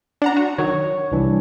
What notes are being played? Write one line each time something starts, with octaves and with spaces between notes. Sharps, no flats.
D4 F#5 A#5
F#4
D#3 F#3 C#5
C2 E3 D4